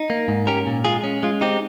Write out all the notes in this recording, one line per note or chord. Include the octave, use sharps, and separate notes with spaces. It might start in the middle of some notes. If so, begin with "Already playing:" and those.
Already playing: D#4
A#3
G#2
C#4 G4 A#4
A#2
G#3 F4 G#4
C#4
G#3 F4
C4 D#4 G4